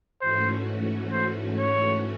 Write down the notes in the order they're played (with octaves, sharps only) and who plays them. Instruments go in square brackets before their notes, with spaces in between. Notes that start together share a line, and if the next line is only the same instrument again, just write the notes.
[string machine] G#2 E3 A3 C#4 F#4 [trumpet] C5
[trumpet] C5
C#5